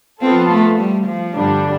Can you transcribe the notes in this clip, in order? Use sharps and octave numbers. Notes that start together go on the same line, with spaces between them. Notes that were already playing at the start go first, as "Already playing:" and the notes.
F3 B3 C4 F4 A4
A3
G3
F3
G2 D3 G3 D4